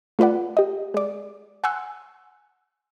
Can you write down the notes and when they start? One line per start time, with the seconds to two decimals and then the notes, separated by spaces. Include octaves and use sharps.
0.19 A3 F4 B4 D5 F#5
0.57 G4 D#5
0.94 G#3 D5
1.64 F#5 G#5 C6 C#6 E6 F#6